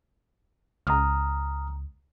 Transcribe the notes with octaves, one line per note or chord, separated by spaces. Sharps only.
C#2 A#5 D#6 F6